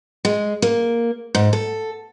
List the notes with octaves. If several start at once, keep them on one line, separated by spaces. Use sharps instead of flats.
G#3
A#3
G#2
A4